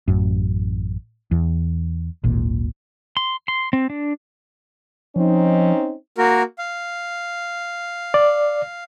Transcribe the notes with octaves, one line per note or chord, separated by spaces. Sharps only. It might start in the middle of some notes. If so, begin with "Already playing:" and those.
A1 F#2
E2
D1 G#1 A#2
C6
C6
C4
D4
F3 C4 C#4 D#4
A#3 F#4 A#4
F5
D5